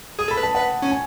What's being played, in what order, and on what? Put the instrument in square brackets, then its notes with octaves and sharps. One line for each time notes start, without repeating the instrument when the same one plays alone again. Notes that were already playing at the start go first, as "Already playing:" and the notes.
[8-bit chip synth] G#4 [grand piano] D#6
[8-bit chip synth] A4 [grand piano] B5
[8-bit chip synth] B4
[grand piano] A5
[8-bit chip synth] B4 [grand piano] F#5
[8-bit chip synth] C#4
[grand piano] G#5